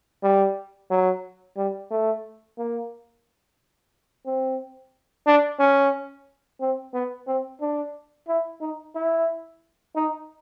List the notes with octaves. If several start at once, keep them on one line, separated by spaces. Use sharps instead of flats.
G3
F#3
G3
A3
A#3
C4
D4
C#4
C4
B3
C4
D4
E4
D#4
E4
D#4